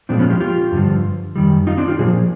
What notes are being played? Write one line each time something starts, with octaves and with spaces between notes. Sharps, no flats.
A#2 F3 G#3 C4 D4
B3 C#4
F4 G4
F4 G4
G2 D3 F3
F#2 D#3 G3
D#4 F4
C4 D4
F4 G4
A#2 F3 G#4